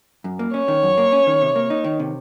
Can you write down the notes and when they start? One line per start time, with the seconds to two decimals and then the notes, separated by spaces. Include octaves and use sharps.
0.24 F#2
0.39 A#3
0.54 C#4 C#5
0.68 D#3
0.83 F#2
0.98 A#3
1.12 C#4
1.27 D#3
1.42 C3
1.56 A#3
1.70 D#4
1.84 D#3
2.00 C3